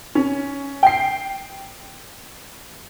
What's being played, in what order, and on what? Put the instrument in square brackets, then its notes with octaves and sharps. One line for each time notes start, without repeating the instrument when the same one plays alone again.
[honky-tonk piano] C#4
G5 C7